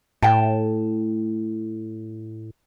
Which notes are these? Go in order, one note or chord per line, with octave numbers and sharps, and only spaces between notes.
A2 G5 A5